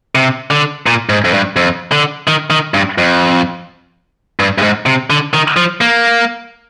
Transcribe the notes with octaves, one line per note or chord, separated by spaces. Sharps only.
C3
D3
A#2
G#2
F2
G2
F2
D3
D#3
D#3
G2
F2
G2
G2
G#2
C3
D3
D#3
F3
A#3